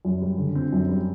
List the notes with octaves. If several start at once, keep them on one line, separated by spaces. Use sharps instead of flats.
F#2
G3
D3
C4
F#2
G3